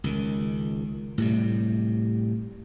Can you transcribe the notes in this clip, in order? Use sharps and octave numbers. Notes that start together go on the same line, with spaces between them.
C#2 D#3
A2 C3 G3